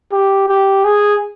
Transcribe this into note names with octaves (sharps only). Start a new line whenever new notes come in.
G4
G4
G#4